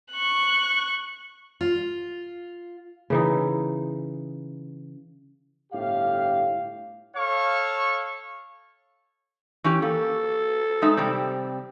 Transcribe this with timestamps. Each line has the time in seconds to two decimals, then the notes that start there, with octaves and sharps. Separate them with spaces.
0.12 C#6 F#6
1.61 F4
3.10 C#3 E3 D#4
5.73 G1 A2 G4 F5
7.15 A4 C#5 F5 C#6
9.64 E3 C#4 G4
9.82 A#3 A4
10.82 G#3 D#4 E5
10.97 C3 G3 C4